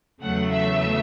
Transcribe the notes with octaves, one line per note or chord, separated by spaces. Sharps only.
E2 C#3 F#3 A3 F#5
E5